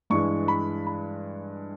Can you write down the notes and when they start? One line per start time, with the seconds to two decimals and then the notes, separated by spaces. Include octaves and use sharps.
0.10 G2 E3 G#3 C#6
0.48 B5
0.87 B5